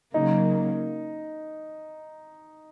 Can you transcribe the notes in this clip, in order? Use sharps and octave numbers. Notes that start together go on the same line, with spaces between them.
C#3 F#3 A#3 D#4